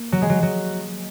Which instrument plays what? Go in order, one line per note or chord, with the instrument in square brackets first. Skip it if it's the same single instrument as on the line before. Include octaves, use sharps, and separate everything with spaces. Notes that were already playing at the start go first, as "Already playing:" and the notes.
Already playing: [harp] A#3
F#3
G#3
F#3
F#3